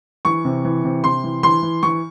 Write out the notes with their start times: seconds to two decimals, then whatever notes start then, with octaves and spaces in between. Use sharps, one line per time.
0.25 E3 C#6
0.45 C3
0.65 E3
0.84 C3
1.04 C3 C6
1.24 E3
1.43 E3 C6
1.63 E3
1.83 E3 C#6